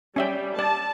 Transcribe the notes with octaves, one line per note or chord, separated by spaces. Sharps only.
G3 C#4 E5 G5
D5 A5